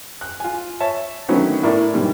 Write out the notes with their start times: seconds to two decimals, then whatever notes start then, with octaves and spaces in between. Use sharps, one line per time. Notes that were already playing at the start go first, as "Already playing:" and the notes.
0.21 F#6
0.40 F4 G#5
0.80 C#5 E5 A5
1.29 D3 D#3 F#3 A3 B3 C#4
1.63 A2 E4 A#4 D5
1.94 G#2 B2 D3 D#3 G3